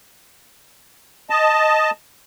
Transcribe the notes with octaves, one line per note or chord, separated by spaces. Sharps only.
D#5 A5